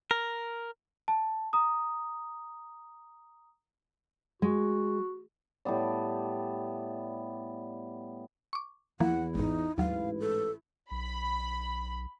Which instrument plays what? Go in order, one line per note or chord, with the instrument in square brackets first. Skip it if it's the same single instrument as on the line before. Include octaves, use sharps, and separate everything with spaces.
[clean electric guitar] A#4
[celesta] A5
A#5 D#6
[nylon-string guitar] G#3 [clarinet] F#4
[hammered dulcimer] A2 G3 B3 D5
[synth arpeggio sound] C#6 D6
[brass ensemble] E2 [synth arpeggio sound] E3 F3 A#3 [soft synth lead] E4 [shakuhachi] F#5
[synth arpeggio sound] G#1 G#2 [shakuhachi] D#4
[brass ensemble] A1 G#2 B4 [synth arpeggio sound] D#2 F#3 [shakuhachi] F5
[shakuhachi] A4
[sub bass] B1 [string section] B5